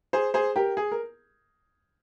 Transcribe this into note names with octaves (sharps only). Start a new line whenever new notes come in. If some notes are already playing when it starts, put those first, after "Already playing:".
G#4 C5
G#4 C5
G4 A#4
G#4
A#4